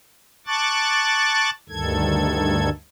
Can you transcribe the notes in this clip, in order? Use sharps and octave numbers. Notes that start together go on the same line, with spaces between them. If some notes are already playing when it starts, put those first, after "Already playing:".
A5 C#6 D6 F#6 A6
D2 G2 D#3 A4 G#6